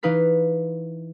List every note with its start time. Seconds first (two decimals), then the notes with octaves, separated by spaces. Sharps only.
0.03 E3 D#4 B4 F5 B6